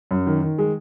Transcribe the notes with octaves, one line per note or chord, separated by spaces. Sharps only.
F#2
D#3
D#3
G#3